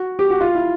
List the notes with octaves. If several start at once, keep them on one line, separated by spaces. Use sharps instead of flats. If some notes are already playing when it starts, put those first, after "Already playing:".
Already playing: F#4
G4
F#4
F4
E4